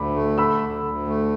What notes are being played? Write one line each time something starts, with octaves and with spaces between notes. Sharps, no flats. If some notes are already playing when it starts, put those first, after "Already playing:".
Already playing: D2 B5 D6
A3
D3 B5 E6
D2
D2
A3